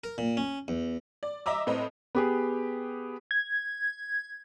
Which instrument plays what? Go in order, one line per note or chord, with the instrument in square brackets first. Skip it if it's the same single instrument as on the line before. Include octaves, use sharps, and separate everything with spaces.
[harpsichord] A#4
A#2
C#4
E2
[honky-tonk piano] D5
D#5 E5 A#5 D6 E6
A2 C4 B4 D#5
[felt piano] B3 G4 G#4
[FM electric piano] G#6